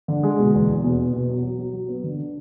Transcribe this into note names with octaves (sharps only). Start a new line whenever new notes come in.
D3
G#3
B2
E2
E2
B2
B3
B2
F#3
F#3
F#3
F#3
B3
D3
D4